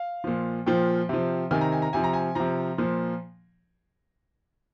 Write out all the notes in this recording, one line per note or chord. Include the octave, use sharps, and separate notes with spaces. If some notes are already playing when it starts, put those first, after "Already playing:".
Already playing: F5
A#2 F3
A#2 F3 G5
C3 F3
C3 D#3 G#5
A#5
G#5
A#5
C3 F3 G#5
A#5
G#5
C3 F3 A#5
A#2 F3